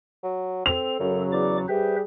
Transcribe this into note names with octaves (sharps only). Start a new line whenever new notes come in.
F#3
C4 A4 F7
F#2 C#3 F#3
E2 D5 D6
G3 G4 G#4 B4 C5 E5